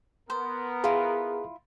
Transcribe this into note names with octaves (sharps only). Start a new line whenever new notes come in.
B3 A#4 C5
E4 F4 G#4